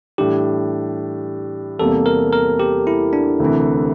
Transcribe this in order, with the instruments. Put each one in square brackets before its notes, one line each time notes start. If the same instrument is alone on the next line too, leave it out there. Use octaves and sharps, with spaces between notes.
[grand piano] A2 E3 G3 D4 [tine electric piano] G4
[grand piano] E2 C3 G3 A#3 [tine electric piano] A4
[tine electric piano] A#4
A#4
G4
E4
D4
[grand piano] D2 C3 E3